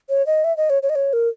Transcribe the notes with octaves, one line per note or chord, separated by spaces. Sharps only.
C#5
D#5
E5
D#5
C#5
C#5
D#5
C#5
A#4